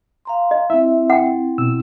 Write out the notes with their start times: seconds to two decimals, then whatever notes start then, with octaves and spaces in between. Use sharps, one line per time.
0.25 F5 A#5 C6
0.51 D#5
0.70 C4 E4 E5
1.10 F#5 G5
1.58 B2 E6